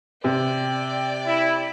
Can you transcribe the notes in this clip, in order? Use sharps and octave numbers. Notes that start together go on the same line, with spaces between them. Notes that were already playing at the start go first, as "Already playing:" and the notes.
C3 D5 G5
E4